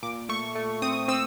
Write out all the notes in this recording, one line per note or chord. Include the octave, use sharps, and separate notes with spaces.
A#2 D6
A3 C#6
A3
C4 D#6
C4 E6